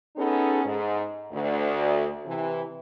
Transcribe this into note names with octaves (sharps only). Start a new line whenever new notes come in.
B3 C#4 D#4 G#4 A4
G#2
D2
C3 E3